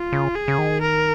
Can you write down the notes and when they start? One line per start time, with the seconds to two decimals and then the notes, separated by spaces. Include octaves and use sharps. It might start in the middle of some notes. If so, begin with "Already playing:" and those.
Already playing: F4
0.12 C#3
0.36 G#4
0.48 C#3
0.58 D#3
0.82 A#4